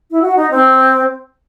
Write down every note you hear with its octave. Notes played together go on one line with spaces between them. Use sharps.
E4
F#4
D#4
C4